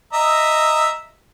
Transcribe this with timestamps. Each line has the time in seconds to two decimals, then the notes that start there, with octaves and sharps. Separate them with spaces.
0.13 D#5 E5 A#5